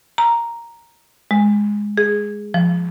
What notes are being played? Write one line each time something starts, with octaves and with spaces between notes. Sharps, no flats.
A#5
G#3
G#4
F3